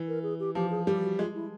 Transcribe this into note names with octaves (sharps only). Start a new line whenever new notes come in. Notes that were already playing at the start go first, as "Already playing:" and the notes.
Already playing: E3
A#4
G#4
G4
F3 G4
G#4
G3 G4
F#4
G#3 F4
E4